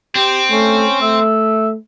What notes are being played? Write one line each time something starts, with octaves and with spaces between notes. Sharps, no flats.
C4 G4
A3 C#4
A3 E5